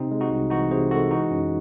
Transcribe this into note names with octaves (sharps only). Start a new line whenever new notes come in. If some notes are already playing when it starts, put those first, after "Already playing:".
Already playing: C3 C4 D#4
G#3
D#4 F#4
C2
E3 D#4 F#4
C3 G#4 C5
G#3 F#4 A4
E3 D#4 F#4
F#2 C#4